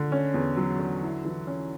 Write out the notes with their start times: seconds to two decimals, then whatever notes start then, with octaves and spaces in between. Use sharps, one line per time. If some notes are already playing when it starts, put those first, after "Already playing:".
Already playing: D3
0.12 C#4
0.34 E2
0.57 F#3
0.79 D3
1.03 E4
1.25 E3
1.47 C#4